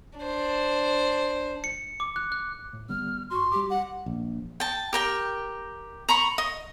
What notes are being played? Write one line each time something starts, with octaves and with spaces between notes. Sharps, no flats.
D4 C5
C#7
D6
F#6
F#6
A2
D3 G3 B3 F6
G2 F#4 C6 C#6
G3 G4 D6
F#5
A#1
G5 A5
G4 A#4 G5
A#5 B5 C#6
D#5